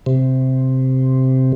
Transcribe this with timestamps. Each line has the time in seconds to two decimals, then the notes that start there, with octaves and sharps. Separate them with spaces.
0.06 C3